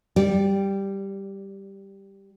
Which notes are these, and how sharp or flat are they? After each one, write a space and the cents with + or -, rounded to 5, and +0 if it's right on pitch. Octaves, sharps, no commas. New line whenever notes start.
G3 +0 D5 -20